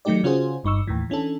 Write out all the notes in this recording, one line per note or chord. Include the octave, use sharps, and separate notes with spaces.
D#3 F#3 A3 D#4 G4 D5
C#3 C#4 F4 F#4 G#4 C5
G1 G2 D#4 C#6 E6
D#2 A2 D#3 E3
E3 C#4 D4 A4